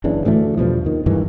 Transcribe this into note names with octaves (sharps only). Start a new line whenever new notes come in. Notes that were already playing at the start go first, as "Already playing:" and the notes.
F#1 C#3 E3 D4
D2 A2 E3 A3
E2 G2 B2 F3
D#2 D#3
G2 D#3 E3 G#3